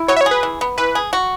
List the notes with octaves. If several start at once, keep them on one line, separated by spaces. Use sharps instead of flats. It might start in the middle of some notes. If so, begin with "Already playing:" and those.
Already playing: E4
F#3 C#5
E5
C#5
G#4
B4
E3
B3
E3 B4
G#4
F#4